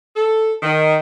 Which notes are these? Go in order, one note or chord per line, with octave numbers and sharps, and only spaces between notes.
A4
D#3